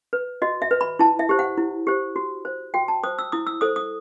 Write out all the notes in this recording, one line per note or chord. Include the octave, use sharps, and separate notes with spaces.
B4
F#4 D#5
E5
B4
B5
E4 A5
E5
G4 C5
F#5
E4
G4 C5
F#4
C5
F#4 G5
A5
C5 D#6
E6
E4 D#6
E6
A4 C5 D#6
D#6